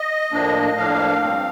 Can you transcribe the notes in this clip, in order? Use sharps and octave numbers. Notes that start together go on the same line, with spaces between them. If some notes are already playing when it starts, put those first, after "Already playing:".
Already playing: D#5
A2 F3 A#3 D4
A2 F3 A#3 D4 F5
G2 F3 C4